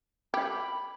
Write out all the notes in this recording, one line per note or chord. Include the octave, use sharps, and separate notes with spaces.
G4 B5